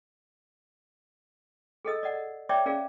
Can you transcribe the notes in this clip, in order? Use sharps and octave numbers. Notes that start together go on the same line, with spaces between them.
G#4 A4 D#5 E6
D5 D#5 F#5
C#5 D5 E5 G5 D6
C#4 G#4 A#4 D5 F5